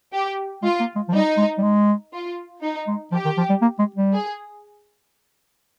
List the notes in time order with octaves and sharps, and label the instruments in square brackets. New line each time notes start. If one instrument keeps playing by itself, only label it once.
[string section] G4
[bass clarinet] G#3 [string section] F4
[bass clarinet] A#3
G#3
F3
[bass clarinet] G3 [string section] D#4
[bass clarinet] G#3
G3
G#3
[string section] F4
D#4
[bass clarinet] G#3
[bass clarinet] F3 [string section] G4
[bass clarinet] D#3
F3
G3
A#3
G#3
G3
[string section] G#4